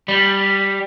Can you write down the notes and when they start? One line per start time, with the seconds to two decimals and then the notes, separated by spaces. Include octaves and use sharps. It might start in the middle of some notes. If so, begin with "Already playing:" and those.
0.08 G3